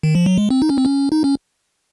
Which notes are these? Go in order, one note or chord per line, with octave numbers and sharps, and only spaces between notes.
D#3
F3
F#3
G#3
C4
D#4
C#4
C4
C#4
D#4
C#4